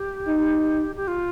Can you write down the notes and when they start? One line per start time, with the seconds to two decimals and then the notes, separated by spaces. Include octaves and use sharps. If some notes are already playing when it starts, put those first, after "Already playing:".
Already playing: G4
0.28 D#4
0.96 G4
1.08 F4